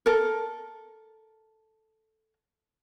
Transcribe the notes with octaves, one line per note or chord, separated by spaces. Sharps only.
A4 A#4